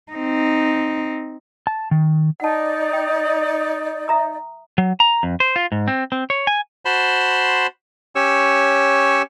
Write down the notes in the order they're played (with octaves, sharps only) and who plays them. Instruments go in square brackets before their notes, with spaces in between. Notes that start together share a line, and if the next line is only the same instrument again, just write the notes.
[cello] C4 D#4
[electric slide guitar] A5
D#3
[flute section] D#4 D5 [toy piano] F#5 A5
[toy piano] G5
E5 A#5 D#6
[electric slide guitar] F#3
A#5
F2
C5
F4
G#2
C4
C4
C#5
G#5
[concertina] F#4 C5 A5 B5 C6
C#4 G4 C#5 C#6 E6